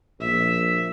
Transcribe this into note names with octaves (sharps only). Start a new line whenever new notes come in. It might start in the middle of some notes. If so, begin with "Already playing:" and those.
A#1 E5